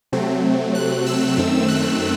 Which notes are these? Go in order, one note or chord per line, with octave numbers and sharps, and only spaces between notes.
C3 F#3 A3 C4
F#6
E6
F#2 D#3 A3 C4
F#6